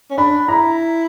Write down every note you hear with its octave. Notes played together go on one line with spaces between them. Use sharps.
C#4
D4 B5
E4 A#5